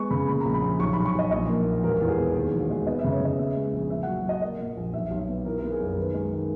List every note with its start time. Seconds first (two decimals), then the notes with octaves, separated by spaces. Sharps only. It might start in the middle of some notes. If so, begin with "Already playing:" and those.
Already playing: G#3 B3 C#6
0.10 C#3 B5
0.28 A#2 B5
0.40 A#1 A#5
0.54 B5
0.62 A#1
0.79 B1 C#6
0.93 B1 B5
1.06 C#6
1.15 B1 D#5
1.31 A#1 D#5
1.48 A#3
1.66 A#2
1.83 E1 A#4
2.01 E2
2.09 G#4
2.18 B2
2.35 D#2 G#4
2.53 E1
2.70 G#3
2.87 B3 D#5
2.99 E5
3.04 C#3
3.12 C#5
3.21 C#3 D#5
3.38 B3 E5
3.56 G#3
3.73 A#1
3.90 A#2 E5
4.03 F#5
4.07 F#3
4.25 F#3 D#5
4.42 A#3 D#5
4.59 A#2
4.77 A#1
4.93 B1 E5
5.11 B1
5.28 B3
5.45 E3 A#4
5.58 A#4
5.63 B3
5.72 G#4
5.80 F#2 A#4
5.97 D#3 B4
6.14 G#3
6.32 D#3